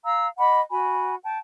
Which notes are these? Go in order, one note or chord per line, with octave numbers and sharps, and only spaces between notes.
F5 A#5 E6
D#5 F#5 B5 D6
F#4 G#5 B5
G5 A5